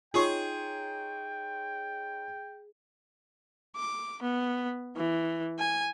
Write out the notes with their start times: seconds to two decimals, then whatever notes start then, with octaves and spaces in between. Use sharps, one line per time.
0.14 D#4 F4 G#4 C#5 G5 C6 C#6
3.76 D6
4.22 B3
4.97 E3
5.59 G#5